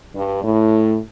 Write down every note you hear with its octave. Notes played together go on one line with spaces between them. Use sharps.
G2
A2